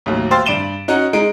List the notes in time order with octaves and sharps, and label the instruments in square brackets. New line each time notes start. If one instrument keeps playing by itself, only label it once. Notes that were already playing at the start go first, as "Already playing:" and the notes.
[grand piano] A1 D#2 F#3
C5 F5 G5 C6 E6 A6
G2 D5 D7 E7 G7
C#4 D#4 F#4 F#5
G#3 D#4 D7